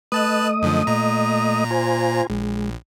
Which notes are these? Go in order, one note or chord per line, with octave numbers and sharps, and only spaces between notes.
A3 B4 D#5 A5 D#6 F#6
F#2 D3 F3
A#2 A#5
F4 C5 G#5
A#1 G#3